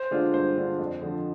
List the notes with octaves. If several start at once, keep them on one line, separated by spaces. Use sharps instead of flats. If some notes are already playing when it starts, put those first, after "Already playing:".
Already playing: C5
D3 G#3 D4 F4
G2 C5
D3 G#3 D4 F4
F2
D3 F3